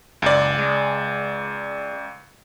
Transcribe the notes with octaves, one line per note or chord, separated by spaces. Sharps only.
F#1 C#2 D5
G#3